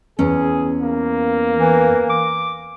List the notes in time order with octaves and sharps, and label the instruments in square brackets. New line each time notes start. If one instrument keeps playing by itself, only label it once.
[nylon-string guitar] E2 C#4 [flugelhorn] G#4
[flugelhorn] A#3
[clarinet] E3
D6